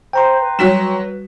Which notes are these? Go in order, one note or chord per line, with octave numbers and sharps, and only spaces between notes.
C5 G5 A#5 C6
B4
F#3 G3 F#4 B6 E7